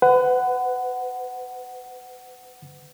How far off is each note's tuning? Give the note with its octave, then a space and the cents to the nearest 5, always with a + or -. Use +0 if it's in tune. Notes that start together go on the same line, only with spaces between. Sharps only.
B4 +35 F#5 +5